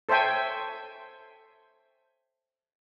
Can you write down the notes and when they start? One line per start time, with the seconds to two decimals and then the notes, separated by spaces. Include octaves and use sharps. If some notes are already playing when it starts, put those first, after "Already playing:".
0.09 A4 C5 C#5 E5 G5 G#5